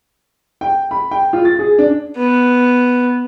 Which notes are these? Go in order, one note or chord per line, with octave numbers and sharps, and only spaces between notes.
G5
B5
G5
F4
A6
G#4
D4
B3